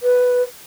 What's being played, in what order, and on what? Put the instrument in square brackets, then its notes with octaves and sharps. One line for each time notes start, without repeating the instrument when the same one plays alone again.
[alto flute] B4